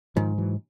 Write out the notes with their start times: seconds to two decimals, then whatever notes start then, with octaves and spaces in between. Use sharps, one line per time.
0.16 G#2 D#3 F3
0.38 E3 F#3